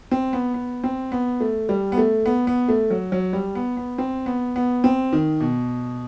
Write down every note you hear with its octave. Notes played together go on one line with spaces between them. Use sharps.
C4
B3
B3
C4
B3
A3
G3
B3
A3
B3
B3
A3
F#3
F#3
G3
B3
B3
C4
B3
B3
C4
D#3
B2